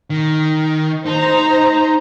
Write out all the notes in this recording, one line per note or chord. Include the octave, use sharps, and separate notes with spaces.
D#3
D#4 C5 A#5